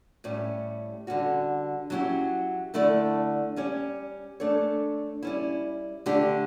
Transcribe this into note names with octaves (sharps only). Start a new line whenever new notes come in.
A2 G3 C#4 G4
D3 G3 C#4 F#4
F#3 C#4 E4 G4
D3 A3 E4 A4 D5
G3 C#4 G4 C#5
A3 D4 A4 C#5
G3 C#4 E4
D3 A3 D4 G4